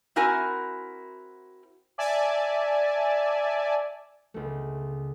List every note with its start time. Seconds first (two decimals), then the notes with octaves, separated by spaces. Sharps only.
0.16 C4 E4 F#4 A#4 G#5
1.98 D5 E5 G#5 A5
4.34 C#2 A3